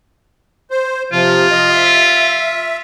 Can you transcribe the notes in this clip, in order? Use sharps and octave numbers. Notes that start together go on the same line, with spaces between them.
C5
C3 F3 F4
D#5
E5